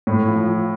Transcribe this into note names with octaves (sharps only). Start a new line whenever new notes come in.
A2
F3
F3